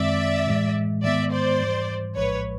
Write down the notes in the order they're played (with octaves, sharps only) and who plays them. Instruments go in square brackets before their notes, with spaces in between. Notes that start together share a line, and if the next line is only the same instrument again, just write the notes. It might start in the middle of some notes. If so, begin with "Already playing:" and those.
Already playing: [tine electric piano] F#2 D#3 G#3 C4 [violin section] D5 E5
[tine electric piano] A2 E3 G#3
[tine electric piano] G#2 D#3 G#3 B3 [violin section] D5 E5
[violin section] C5 D5
[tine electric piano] G#2 E3 G3
[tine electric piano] A#1 A2 F3 G#3 [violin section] B4 C#5